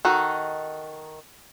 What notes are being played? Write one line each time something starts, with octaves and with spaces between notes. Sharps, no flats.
D#3 D#4 F#4 A4